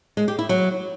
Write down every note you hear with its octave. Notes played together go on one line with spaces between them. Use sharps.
G#3
G4
E4
F#3